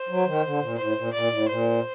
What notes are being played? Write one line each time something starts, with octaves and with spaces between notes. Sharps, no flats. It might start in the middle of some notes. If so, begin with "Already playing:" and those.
Already playing: C5
F#3
D#3
D3
A#2
A2 C5
A#2
A#2 D5
A2
A#2 C5